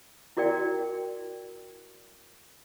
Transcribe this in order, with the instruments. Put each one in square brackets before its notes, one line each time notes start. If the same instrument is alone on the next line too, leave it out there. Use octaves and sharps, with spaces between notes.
[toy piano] E4 F#4 A#4 D5 G5